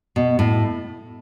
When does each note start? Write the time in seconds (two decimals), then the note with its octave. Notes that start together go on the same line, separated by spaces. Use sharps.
0.16 B2
0.39 A2